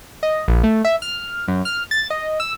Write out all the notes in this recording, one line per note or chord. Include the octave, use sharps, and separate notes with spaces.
D#5
A#1
A3
E5
F6
F#2
F6
A6
D#5
E6